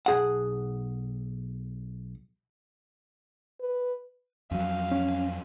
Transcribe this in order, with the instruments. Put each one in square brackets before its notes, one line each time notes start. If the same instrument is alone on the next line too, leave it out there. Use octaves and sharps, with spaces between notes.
[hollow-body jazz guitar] B1 G#4 F#5
[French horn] B4
[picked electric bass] F2 F#3 [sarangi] F5
[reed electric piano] C#4